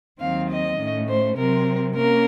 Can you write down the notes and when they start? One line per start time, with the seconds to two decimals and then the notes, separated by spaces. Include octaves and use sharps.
0.20 D#2 D#3 F#3 C4 F5
0.50 D#5
0.78 A2 A3 C#4
1.08 C5
1.37 C3 F#3 C4 A#4
1.96 A#3 C#4 A#4